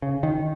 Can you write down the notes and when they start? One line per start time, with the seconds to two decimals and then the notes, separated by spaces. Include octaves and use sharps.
0.02 C#3
0.23 D#3